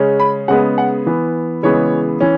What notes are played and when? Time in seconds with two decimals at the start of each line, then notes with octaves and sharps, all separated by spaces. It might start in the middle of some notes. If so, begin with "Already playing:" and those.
Already playing: C#3 G#3 C#4
0.20 B5
0.48 C#3 G#3 B3 F#5
0.78 F#5
1.06 E3 B3
1.63 C#3 E3 G#3 B3 C#5
2.21 E3 C#4